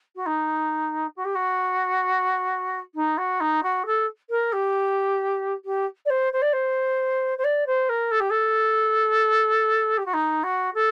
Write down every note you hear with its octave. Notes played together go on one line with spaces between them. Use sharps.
F#4
D#4
F#4
G4
F#4
D#4
F#4
D#4
F#4
A4
A#4
G4
G4
D5
C5
C5
D5
C5
C5
D5
C5
A#4
A4
G4
A4
G4
F#4
D#4
F#4
A4